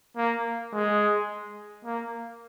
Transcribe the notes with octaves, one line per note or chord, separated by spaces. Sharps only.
A#3
G#3
A#3